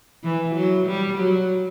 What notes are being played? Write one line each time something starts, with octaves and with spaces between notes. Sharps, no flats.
E3
F#3
G3
F#3